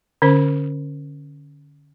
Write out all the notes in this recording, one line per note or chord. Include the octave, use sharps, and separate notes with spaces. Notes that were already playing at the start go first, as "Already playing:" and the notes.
D3 C#4 C5